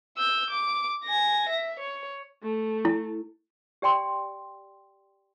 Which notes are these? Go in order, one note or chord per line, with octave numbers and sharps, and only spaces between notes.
E6 G6
D6
G#5 A#6
E5
C#5
A3
E4
G4 D5 G5 C6